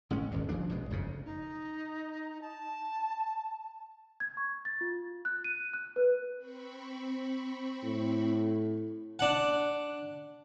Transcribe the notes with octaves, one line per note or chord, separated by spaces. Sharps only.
A1 G#3 C#4
D#1 G#1 G2
C#3 F3 A#3 D4
B1 B2 G#3
F#1 F2 C#3
D#4
A5
G#6
C#6
A6
F4
F#6
D#7
F#6
B4
C4 B5 C#6
A2
D4 F#5